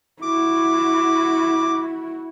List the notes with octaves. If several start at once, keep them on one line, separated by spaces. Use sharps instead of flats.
E4 F#4 D6